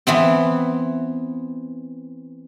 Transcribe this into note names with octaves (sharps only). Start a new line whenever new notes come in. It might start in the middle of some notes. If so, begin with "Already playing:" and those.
E3 B3 C4